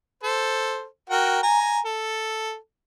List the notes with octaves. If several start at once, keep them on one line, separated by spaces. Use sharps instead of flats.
A4 C5
F#4 A#4 G5
G#5 A#5
A4